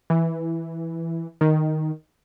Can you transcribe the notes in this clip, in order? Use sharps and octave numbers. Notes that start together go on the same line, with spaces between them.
E3
D#3